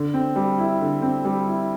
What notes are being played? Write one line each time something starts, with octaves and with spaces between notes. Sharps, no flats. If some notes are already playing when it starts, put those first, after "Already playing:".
Already playing: D3
C4
G3
E4
D3
C4
G3
E4